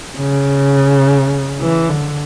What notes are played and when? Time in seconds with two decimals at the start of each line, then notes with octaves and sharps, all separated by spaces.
0.18 C#3
1.60 E3
1.89 D3